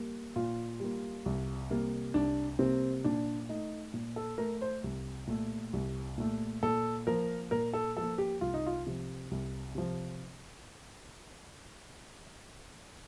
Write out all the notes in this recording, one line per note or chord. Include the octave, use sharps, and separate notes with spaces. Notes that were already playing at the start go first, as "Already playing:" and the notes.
Already playing: G3 A#3
A#2 F4
G3 A#3
C2
C3 G3 A#3
C2 D4
C3 G3 A#3 C4
A#2 D4
A3 D#4
A#2
A4
A3 A#4
C5
C2
A#2 A3
C2
A#2 A3
A#2 A4
F3 A#3 A#4
A#2 A#4
A4
F3 A#3 A4
G4
C2 F4
D#4
F4
C3 F3
C2
C3 F3